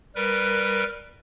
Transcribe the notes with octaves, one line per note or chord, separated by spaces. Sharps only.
G3 A#4 B4